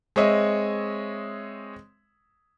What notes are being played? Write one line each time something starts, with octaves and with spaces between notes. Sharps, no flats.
G#3 C4 C#5 D#5 E5